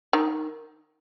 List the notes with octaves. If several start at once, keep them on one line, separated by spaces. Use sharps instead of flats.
D#3